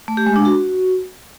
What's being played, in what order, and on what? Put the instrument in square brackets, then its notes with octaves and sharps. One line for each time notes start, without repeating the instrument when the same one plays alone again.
[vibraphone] A3
G4
G#3
D4
F#4